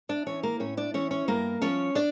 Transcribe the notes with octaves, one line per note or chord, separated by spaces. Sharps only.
D4 D5
E3 C#4 C#5
A#3 A#4
A2 C#4 C#5
D4 D5
E3 C#4 C#5
C#4 C#5
G2 A#3 A#4
F3 C#4 C#5
D4 D5